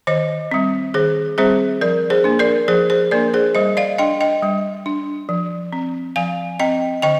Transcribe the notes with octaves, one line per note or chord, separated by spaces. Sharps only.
D#3 C5 D#5
G3 C4
D#3 G#4 C5
G3 C4 G#4 C5
F3 A#4 D5
G#4 C5
A#3 D4
A#4 D5
F3 G#4 C5
G#4 C5
A#3 D4 A#4 D5
G#4 C5
G3 C5 D#5
D5 F5
D4 D#5 G5
D#5 G5
G3
D4
F3
C4
F3 F5 G#5
C4 D#5 G5
D3 D#5 G5